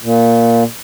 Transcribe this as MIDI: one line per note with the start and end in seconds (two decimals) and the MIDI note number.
0.02 0.63 46